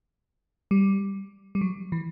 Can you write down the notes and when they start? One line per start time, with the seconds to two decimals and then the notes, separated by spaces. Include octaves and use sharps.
0.71 G3
1.55 G3
1.61 F#3
1.92 E3